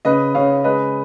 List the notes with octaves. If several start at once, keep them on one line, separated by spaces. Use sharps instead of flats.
C#3 B4 D#5
C#3 C#5 F5
G#3 B4 D#5